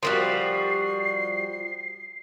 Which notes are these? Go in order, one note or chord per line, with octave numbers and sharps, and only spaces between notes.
F3 G3 F#4 A#4 C6 C7